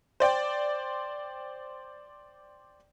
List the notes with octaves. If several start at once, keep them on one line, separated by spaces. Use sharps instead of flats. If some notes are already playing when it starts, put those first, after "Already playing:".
C5 D5 G5